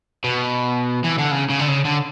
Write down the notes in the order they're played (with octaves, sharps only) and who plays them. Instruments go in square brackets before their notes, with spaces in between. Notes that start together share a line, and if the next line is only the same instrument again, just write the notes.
[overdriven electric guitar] B2
E3
D3
C#3
C#3
D3
C#3
D3